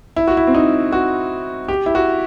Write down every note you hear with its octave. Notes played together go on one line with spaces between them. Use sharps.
E4
F#4
E4
C4
D#4
F#4
G4
E4
F#4